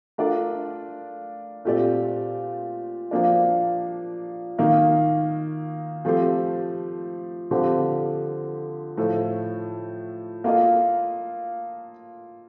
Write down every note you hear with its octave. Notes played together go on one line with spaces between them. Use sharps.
A3 D4 F4 A#4 D5
A#2 A3 C4 G4 D5
F3 A#3 D4
D#3 A#3 D#4
F3 A3 C4 G4 C5
D3 F3 C4 G4
A2 F3 A3
A#3 F4 A4 D#5